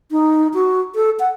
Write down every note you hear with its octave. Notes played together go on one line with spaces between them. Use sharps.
D#4
F#4
A4
F#5